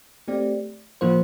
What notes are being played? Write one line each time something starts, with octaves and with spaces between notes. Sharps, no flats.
A3 C4 G4 D5
A#2 F3 A#3 F4 C5